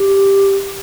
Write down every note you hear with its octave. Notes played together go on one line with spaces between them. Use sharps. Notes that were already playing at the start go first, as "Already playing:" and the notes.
Already playing: G4